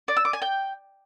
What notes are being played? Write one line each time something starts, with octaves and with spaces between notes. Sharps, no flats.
D5
E6
D6
G#5
G5